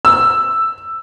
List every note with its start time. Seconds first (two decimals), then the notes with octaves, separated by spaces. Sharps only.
0.05 E6